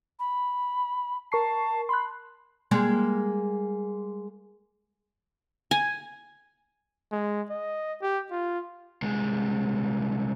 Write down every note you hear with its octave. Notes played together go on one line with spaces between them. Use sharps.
B5
A#4 A5 C#6 C7
B5 C6 F#6
G3 G#3 A#3
G#5
G#3
D#5
G4
F4
C2 G#3